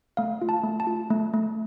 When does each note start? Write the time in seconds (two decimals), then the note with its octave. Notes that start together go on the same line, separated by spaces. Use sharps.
0.17 A3 F5
0.42 F4
0.49 A5
0.64 A3
0.80 A5
0.87 F4
1.10 A3
1.33 A3